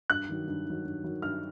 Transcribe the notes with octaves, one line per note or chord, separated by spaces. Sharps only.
G2 F#6
D#3 F#3
G2
D#3 F#3
G2
D#3 F#3
G2 F6